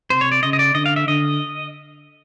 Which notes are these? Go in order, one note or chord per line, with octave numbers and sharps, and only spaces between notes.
C3 C5
C#5
D5
C#3 D#5
D#5
D5
D3 D#5
F5
E5
D3 D#5